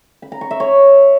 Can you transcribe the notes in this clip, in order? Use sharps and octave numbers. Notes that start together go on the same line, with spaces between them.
B5
A#5
C#6
E5
C#5